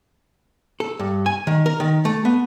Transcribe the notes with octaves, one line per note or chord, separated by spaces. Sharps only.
A4
G2
G#5
D#3
A#4
D#3
A3
B3